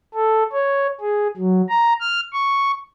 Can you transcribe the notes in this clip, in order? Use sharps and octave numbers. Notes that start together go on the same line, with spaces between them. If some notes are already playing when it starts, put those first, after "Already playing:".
A4
C#5
G#4
F#3
A#5
F6
C#6